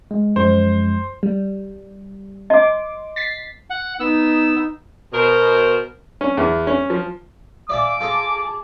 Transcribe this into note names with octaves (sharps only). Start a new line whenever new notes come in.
G#3
F#2 F3 G#3 C5
G3
D#5 C6 D6
A6 B6 C7
F#5
B3 D#4 E6
B2 A#4 C5
C#4
E2
C#4
F3
D5 E5 F5 G#5 A5 D6
F4 G#4 A4 D#5 A5